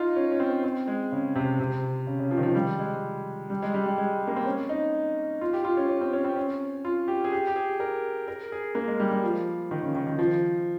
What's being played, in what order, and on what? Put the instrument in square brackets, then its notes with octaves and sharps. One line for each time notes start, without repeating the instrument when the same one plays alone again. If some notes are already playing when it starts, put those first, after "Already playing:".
Already playing: [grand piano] D#4 F4
C#4
C#4
C4
C4
G#3
C#3
C3
C3
C#3
C#3
F3
D#3
F3
G3
G#3
G3
G#3
G3
G3
G#3
A#3
C4
C#4
D#4
F4
G4
F4
C#4
C#4
C4
C#4
C4
C#4
F4
G4
G#4
G4
G4
G#4
A#4
A#4
G#4
A#3
G#3
G3
G3
F3
D#3
C#3
D#3
D#3
F3